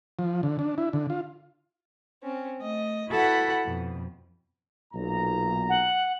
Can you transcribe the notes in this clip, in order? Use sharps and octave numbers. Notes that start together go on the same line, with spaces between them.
F3
D3
D4
E4
D3
F4
C4 C#4
A3 D#5
E4 F#4 A4 B4 F#5 B5
F2 B2
B1 A#2 A#5
F#5